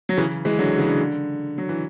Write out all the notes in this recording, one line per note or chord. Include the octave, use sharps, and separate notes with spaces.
F#3
C#3 E3
E3 G#3
D3 F#3
C#3 E3
D3
F#3
E3